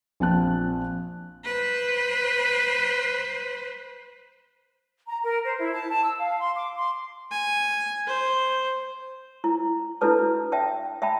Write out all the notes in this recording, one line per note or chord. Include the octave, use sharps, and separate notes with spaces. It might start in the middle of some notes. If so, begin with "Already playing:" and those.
A#1 C4 A5 F#6
B4 C5
A#5
A#4
C5
E4
A5
A5
E6
F5
C6
D6
C6
G#5
C5
E4
D4 E4 F#4 A4 B4 A5
E5 G5 A5
E5 G5 A5 B5